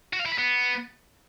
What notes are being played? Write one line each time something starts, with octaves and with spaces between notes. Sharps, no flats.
F#4
F5
E4
B4
B3